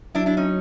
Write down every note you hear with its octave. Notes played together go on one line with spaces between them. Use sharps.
F#3 D4 E4
D4 E4
C#4 D#4